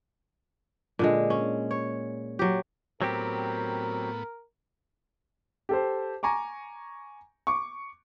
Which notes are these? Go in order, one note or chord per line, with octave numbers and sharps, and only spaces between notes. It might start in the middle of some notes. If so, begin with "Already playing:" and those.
A#2 D3 G#3
C#4
C#5
F#3 G4
A2 F#3 B3 C4 G4 A#4
G4 A4 C5
G#5 A#5 C#6 D6
C#6 D6